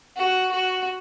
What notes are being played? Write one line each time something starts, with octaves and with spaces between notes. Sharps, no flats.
F#4
F#4